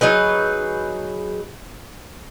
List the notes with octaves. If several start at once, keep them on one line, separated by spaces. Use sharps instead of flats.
F#3 D#4 G#4 B4